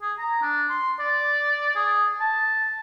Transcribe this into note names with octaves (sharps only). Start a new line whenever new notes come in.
G#4
A#5
D4
C6
D5
G#4
A5